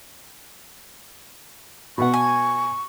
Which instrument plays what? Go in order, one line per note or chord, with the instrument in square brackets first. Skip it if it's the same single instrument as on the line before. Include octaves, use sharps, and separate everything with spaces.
[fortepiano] B2 B3 F#5 [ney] C#6
[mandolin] G#5